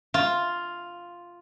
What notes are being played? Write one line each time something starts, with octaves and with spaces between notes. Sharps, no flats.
F4